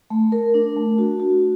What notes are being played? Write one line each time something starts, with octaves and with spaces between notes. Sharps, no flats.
A3
A#4
D4
A3
F#4
F#4